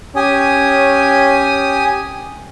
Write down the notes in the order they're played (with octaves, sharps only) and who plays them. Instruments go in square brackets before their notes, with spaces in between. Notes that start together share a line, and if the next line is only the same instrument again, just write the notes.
[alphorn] C#4 [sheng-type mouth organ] G4 G#5 D#6